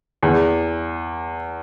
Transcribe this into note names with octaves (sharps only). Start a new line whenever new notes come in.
E2